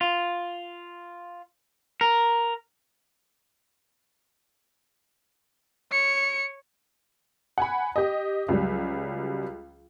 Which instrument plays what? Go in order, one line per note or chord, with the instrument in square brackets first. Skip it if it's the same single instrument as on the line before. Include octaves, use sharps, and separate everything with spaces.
[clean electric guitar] F4
A#4
[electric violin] C#5 C#7
[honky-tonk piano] F#5 G#5 B5
G4 D#5
C#2 F#3 G3